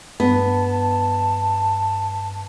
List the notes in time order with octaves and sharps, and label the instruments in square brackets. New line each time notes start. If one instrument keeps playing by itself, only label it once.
[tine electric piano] G2 [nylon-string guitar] B3 [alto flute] A5